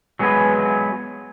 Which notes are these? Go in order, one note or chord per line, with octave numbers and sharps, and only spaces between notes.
F#3 G#3 B3 F#4 G#4 B4